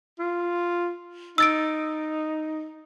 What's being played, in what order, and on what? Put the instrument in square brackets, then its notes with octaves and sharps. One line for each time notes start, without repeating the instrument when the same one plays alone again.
[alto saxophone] F4
[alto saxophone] D#4 [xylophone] E6 A6 D7